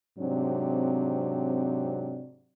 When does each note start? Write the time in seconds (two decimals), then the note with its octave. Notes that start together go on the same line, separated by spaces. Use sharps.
0.19 G#2 C3 F#3 C4 D4